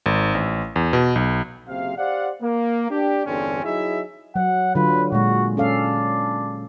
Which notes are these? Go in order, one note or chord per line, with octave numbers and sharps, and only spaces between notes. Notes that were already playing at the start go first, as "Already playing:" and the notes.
G#1
A1
E2
B2
B1
F#1 C3 F5
G4 C5 D5 F5 F#5
A#3
D4 G4
G1 E2 G2 D3 C4 C#4
F#3 D#4 E4 G#4 E5
F#3 F#5
D3 F#3 F4 B4
A#2 G#3 F#4
C#4 D4 A4 F5